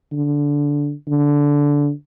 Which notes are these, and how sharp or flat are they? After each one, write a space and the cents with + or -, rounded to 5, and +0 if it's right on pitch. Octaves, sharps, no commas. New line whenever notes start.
D3 -15
D3 -15